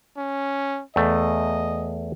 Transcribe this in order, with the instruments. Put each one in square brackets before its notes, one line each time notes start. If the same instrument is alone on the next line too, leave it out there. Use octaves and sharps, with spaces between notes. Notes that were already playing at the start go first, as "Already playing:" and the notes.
[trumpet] C#4
[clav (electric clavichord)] E2 A3 [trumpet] D#5